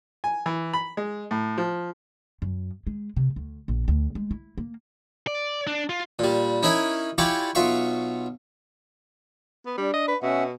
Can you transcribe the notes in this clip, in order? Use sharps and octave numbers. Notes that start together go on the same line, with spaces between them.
G#5
E3
B5
G#3
A2
F3
F#2
G#3
C3
D2
A#1
D2
G#3
E4
A#3
D5
D4
F4
A#2 G3
C#4 D#4 E4 A#4 E5 G#5
E4 F4 G4 D5 G#5 C#6
B1 F4 E5 F5 C#6
B3
G3 D4
D#5
B4
B2 C#4 E5 F#5